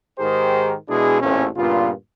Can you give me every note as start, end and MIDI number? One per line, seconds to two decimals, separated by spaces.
0.19 0.74 44
0.19 0.74 51
0.19 0.74 67
0.19 0.74 68
0.19 0.74 70
0.19 0.74 72
0.89 1.19 47
0.89 1.19 56
0.89 1.19 62
0.89 1.19 64
0.89 1.19 68
1.21 1.46 33
1.21 1.46 40
1.21 1.46 46
1.21 1.46 57
1.21 1.46 60
1.21 1.46 61
1.56 1.91 43
1.56 1.91 46
1.56 1.91 49
1.56 1.91 59
1.56 1.91 65